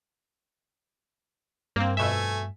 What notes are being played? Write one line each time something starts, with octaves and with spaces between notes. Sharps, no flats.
G2 A#3 C4
F2 B2 A3 E5 G#5